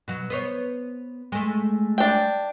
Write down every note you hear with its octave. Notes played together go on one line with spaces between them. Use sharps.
B2 F#3
B3 C5 C#5
G#3 A3
D4 G5